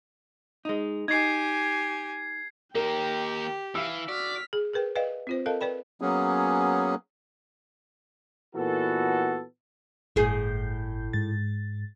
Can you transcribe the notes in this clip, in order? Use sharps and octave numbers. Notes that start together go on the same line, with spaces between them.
G#3 D#4
D#4 G4 G#5 G#6 C7
D#2 A#3 G4 A#4 G5
E3 E5 F5 E6
F#4 D5 F6 B6
G#4
G#4 A#4 B4 G5
B4 D5 D#5 F5 G5
C4 F4 C5
A4 A#4 D#5 F5 A5
B4 D5 G5 B5
F#3 A#3 B3 C#4 G#4
A#2 E3 B3 F#4 A4
G1 A2 G#4 G6
G#2 A6